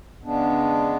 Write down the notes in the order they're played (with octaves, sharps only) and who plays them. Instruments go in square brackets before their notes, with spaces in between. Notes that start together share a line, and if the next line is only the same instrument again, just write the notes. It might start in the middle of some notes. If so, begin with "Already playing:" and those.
[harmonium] C#3 G#3 B3 D4